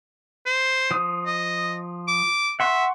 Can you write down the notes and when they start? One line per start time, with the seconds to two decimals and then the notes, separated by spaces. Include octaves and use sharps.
0.46 C5
0.91 F3 D#6
1.26 D#5
2.08 D6
2.60 E5 F#5 C6 C#6